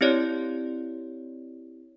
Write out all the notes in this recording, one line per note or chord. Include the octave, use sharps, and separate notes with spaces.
C4 E4 G4 C#5 D5